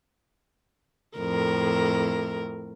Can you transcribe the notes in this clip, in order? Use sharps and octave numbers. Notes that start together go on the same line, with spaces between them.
F2 A2 A#4